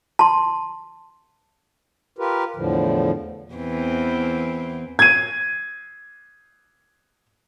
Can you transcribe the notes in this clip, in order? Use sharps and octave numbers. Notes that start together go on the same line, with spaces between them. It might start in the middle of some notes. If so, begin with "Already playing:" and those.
A5 C6
F4 G4 A#4 B4
E2 A2 D3 F3
E2 E3 C4
G#6 D#7